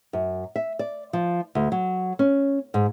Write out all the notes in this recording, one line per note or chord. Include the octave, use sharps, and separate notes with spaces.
F#2
E5
D5
F3
D2
F#3
C#4
G#2